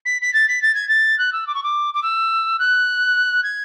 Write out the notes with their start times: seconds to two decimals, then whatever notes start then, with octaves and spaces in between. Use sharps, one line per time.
0.05 B6
0.22 B6
0.34 A6
0.48 B6
0.62 A6
0.74 G#6
0.88 A6
1.18 F#6
1.33 E6
1.47 D6
1.54 C#6
1.63 D6
1.94 D6
2.03 E6
2.59 F#6
3.43 G#6